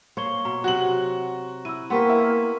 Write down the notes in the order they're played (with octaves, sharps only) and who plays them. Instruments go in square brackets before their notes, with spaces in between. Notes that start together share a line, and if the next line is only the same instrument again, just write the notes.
[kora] A#3 C5 C#5 [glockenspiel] C6 C#6 G7
[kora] B2 [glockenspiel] A#5
[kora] C3 F#3 [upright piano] F#4 F#7
[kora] E4 [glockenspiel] E6 D#7
[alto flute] A#3 [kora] B3 G4 C5 [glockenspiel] C6 C#6 B6
[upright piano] E4